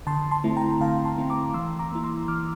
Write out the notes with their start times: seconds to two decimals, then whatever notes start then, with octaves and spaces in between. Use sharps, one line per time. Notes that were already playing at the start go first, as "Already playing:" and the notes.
0.07 D3 A5 C6
0.31 A5 C6
0.44 A3 C4 E4
0.56 G5 A#5
0.80 D3 F5 A5
1.05 A5 C6
1.18 A3 C4 E4
1.30 A#5 D6
1.54 E3 C6 E6
1.79 A#5 D6
1.92 A#3 E4
2.04 C6 E6
2.28 E3 D6 F6